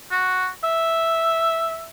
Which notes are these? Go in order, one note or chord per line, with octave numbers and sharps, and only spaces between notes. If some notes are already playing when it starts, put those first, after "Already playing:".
F#4
E5